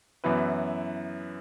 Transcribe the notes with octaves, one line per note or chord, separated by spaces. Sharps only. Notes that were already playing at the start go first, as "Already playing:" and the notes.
F#2 E3 B3 E4 B4